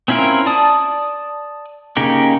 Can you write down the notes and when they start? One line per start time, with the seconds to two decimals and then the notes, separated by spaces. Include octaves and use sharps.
0.08 C4 C#4 E4 F4 A#4
0.46 D5 A5 D#6
1.97 C#3 A#3 D#4 G4